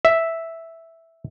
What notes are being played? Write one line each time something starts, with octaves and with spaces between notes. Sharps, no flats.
E5